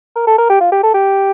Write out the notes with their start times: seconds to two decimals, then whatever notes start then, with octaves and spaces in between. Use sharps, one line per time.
0.16 A#4
0.27 A4
0.38 A#4
0.50 G4
0.61 F4
0.72 G4
0.83 A4
0.95 G4